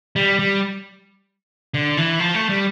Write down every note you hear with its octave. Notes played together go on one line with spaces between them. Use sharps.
G3
G3
D3
E3
F3
A3
G3